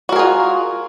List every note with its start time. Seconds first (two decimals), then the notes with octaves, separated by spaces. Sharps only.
0.09 F#4
0.12 A#4
0.16 G#4
0.19 F4